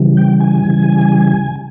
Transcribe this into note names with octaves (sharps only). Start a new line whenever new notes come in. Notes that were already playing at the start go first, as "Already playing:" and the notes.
Already playing: C#3 E3 G3
G5
G#5
C#3 E3 G3